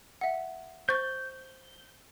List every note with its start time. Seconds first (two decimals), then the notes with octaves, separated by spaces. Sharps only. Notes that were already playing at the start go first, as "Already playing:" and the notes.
0.21 E5 F#5
0.89 C5 C#6 G6 A6